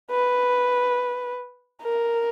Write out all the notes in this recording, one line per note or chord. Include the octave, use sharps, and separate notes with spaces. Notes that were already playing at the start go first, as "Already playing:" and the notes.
B4
A#4